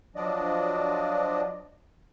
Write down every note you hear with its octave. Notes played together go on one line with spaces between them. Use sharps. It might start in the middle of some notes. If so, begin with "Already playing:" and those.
F3 F#3 D4 D5 D#5